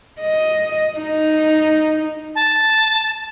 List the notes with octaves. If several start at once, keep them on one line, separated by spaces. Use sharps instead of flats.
D#5
D#4
A5